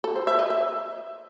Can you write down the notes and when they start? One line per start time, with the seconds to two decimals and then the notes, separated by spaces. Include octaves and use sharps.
0.04 A4
0.16 C5
0.27 E5
0.39 D#5
0.50 E5